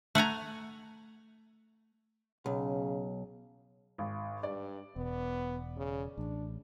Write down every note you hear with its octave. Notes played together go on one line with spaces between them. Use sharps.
A3 F#5 G#5 A#5
B1 C#3
G#1
G2 D5
E1 B3
C#3
A1 D4